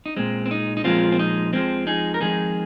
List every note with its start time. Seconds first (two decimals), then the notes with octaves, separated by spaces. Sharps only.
0.06 D#4
0.16 A#2 G#3 C4
0.46 C4
0.51 D#4
0.77 D#4
0.84 A#2 F3 G#3 C4 F4
1.12 C4
1.19 D#4
1.53 F2 F3 G#3 C4
1.87 D#4 G#4
2.14 A#4
2.20 F2 D#3 G#3 D#4 G#4